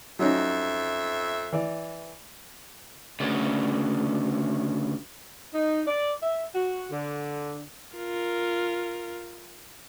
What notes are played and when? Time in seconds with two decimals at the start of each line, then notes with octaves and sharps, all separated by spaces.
0.19 F2 F#3 C#4 D#4 E5
1.52 E3 D5
3.20 D2 C#3
5.55 D#4
5.87 D5
6.23 E5
6.55 F#4
6.91 D3
7.97 F4 A#4